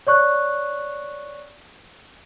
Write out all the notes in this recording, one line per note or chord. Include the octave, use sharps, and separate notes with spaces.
C#5 D5 C#6 F#6